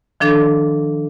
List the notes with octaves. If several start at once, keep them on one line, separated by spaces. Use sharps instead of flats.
D#3 F3 D4 A4